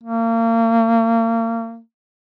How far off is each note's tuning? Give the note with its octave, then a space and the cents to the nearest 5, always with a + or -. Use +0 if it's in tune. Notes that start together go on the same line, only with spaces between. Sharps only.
A#3 -35